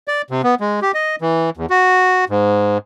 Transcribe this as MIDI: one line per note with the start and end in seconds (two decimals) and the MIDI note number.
0.08 0.22 74
0.30 0.42 48
0.43 0.55 59
0.60 0.80 56
0.82 0.92 67
0.94 1.16 75
1.21 1.50 52
1.57 1.66 40
1.70 2.25 66
2.29 2.78 44